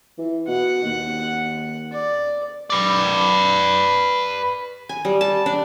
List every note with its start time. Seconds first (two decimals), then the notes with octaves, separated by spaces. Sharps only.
0.18 E3
0.48 B2 F#5
0.84 D#2
1.92 D5
2.70 B4 D5
4.89 G#5
5.05 G3
5.21 A5
5.46 D4